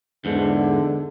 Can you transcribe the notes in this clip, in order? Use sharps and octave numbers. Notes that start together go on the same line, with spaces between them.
E2 G#2 D3